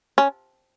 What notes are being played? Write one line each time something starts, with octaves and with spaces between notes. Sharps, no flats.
C#4